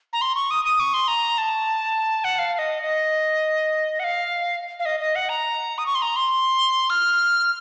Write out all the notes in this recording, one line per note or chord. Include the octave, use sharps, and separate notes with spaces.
A#5
C6
C#6
D#6
D#6
C#6
C6
A#5
A5
F#5
F5
F5
D#5
D#5
F#5
F5
F5
D#5
D#5
F#5
A#5
D#6
C#6
C6
A#5
C6
F6